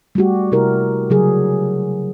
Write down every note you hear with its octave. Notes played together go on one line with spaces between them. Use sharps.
G3 A3 F#4 G4
C3 E4 G4 A#4
C#3 F#3 G#4